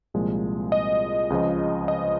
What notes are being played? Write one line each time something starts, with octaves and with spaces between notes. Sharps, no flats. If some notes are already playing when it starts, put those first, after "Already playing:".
C2 A#2 F3 G#3
D#5
C#2 C#3 F3
D#5